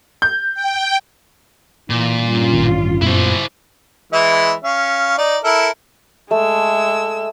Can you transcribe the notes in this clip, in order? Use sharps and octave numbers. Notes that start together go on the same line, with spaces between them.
G6
G5
A#2 E3
G2 C#4 F4
A1 D#3
F#2 A#2 B3 E4 C5
E3 G#3 E4
C#4 F5
D#4 D5
E4 A4 A#4
G#3 A3 E6